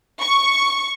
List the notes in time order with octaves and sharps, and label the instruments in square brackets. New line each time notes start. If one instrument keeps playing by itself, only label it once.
[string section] C#6